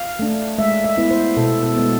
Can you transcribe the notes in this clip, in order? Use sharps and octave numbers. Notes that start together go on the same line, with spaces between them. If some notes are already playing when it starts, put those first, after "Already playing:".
Already playing: F5
A3 D4
G#3 E5
E5
B3 E4
C5
B2 A4
A4
G#3 B3